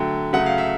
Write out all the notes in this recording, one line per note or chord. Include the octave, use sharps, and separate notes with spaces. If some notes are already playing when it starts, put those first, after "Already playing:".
Already playing: D3 F#3 A3 G5
C#3 F#3 A3 F#5
F5
E5